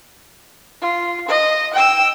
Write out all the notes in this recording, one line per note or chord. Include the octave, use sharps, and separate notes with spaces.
F4
D#5
G5 E6